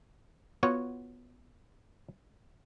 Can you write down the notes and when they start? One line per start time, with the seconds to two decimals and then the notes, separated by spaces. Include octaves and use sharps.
0.63 B3 F4 F#4 C#5